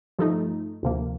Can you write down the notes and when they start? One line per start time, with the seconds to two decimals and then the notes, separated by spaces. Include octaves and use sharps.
0.19 G2 F3 A3 D#4
0.83 D2 C3 F3 A#3